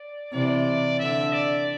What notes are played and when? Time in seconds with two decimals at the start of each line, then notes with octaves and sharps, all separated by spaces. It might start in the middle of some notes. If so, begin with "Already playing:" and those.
Already playing: D5
0.33 C3 E3 D5
1.00 D3 E5
1.33 D5